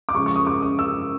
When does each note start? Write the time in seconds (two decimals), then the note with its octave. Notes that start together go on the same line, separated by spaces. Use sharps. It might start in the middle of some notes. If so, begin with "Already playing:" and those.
0.09 D6
0.14 C#3 F3 G#3 C#6
0.26 C#6
0.36 D#6
0.47 D6
0.62 D#6
0.79 E6